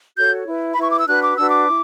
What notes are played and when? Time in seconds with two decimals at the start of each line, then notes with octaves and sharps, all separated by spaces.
0.16 F#4 A4 C#5 G6
0.46 E4 B4
0.73 B5
0.77 E4 B4 C#6
0.90 D6
0.99 E6
1.07 D4 F#4 B4 F#6
1.23 D6
1.36 D4 F#4 B4 E6
1.50 D6
1.68 E4